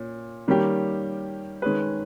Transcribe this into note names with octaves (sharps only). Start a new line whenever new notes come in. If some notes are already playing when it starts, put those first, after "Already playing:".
Already playing: A#2 C#4
D#3 G3 A#3 C#4 G4
D#3 G#3 C#4 G#4 B4